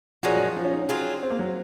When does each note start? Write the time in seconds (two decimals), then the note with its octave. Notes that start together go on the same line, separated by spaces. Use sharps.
0.23 A#2 F3 G#3 C#4 F#4
0.36 F#3
0.39 F3
0.57 F3
0.65 C#4
0.73 D#4
0.82 C#4
0.89 F#3 C4 F4 G#4
1.23 C4
1.30 A#3
1.39 F#3